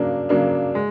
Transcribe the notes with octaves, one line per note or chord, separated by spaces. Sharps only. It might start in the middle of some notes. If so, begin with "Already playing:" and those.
Already playing: C#3 F#3 A#3 D4
C#3 F#3 A#3 D4
G#3